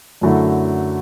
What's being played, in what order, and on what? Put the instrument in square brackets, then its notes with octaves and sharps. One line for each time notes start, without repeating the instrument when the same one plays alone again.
[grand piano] F#2 D3 F#3 A3 E4